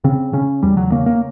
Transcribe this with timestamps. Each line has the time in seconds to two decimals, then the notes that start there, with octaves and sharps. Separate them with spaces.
0.04 C#3 C4
0.33 C#3 C#4
0.63 E2 G3
0.77 F#3
0.92 C#3 A#3
1.06 A#3